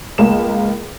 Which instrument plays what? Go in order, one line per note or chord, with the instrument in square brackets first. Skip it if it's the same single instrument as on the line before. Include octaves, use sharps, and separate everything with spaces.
[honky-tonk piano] C#2 A#3 E7